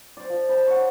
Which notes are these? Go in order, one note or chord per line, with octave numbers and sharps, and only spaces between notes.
C5 D5
F3
B4 A5
C#5 F#5